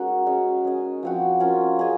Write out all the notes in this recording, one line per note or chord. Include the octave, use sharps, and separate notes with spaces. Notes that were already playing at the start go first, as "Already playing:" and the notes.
Already playing: G#3 C#4 D#4 F#4 A#4
G#3 C#4 G#4
C#4 G#4 D#5
F3 C4 F#4
C#4 F4 A#4
C#4 G#4 D#5